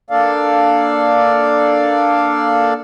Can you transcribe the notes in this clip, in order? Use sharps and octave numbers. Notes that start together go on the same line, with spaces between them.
A#3 D4 A4 D5 F5